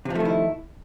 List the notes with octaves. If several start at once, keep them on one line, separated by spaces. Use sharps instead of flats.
C3 D#3 F3 A3 E4